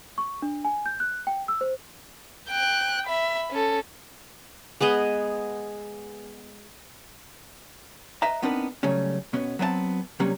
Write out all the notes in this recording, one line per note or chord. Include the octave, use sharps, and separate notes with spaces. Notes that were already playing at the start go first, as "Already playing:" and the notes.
C#6
D4
G#5
G6
F#6
G5
E6
C5
G5 F#6
E5 B5
C#4 A4
G#3 B3 G#4 D#5
B4 D#5 E5 A#5
B3 C4 D4 D#4 A#4 B4
C#3 F#3 G3 A3 C#4
B2 B3 C#4
F#3 B3 C4 D#5 A5
C3 F#3 G3 A#3 C#4